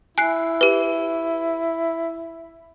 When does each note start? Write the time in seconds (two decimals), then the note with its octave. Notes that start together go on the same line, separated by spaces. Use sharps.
0.18 E4 G#5 F#6 C7
0.61 G4 B4